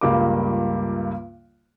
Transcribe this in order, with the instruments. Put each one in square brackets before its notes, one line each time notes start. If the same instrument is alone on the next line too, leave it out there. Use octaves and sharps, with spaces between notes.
[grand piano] C#2 G2 G3 A#3 F4 D6